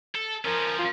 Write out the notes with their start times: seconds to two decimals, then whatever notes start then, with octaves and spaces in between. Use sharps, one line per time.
0.15 A4
0.45 F3 C#4 A#4
0.79 F4